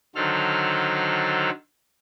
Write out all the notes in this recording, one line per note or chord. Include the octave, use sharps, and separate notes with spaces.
D3 D#3 F#3 A4 C5 F6